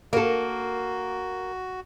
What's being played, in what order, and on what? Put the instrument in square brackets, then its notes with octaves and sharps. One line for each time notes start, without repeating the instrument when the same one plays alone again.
[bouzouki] A#3 [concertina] F#4 [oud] A4 A#4